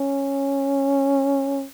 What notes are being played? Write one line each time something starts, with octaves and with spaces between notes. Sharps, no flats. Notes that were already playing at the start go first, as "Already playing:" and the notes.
Already playing: C#4